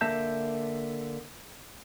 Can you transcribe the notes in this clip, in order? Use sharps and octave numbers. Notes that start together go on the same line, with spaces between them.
D3 A#3 E5 A5 G6